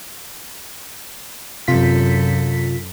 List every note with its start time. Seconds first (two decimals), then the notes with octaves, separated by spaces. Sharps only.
1.68 F#2 C3 F4 A4 B6